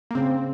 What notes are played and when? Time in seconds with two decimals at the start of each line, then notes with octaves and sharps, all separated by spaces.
0.11 A#3
0.15 C#3 C4